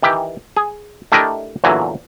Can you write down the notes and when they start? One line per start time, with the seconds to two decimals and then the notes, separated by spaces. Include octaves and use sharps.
0.03 D#3 E3 G4
0.57 G#4
1.12 A3 D4 E4 G4 A#4 D#5
1.64 E2 A#2 D3 E3 F#3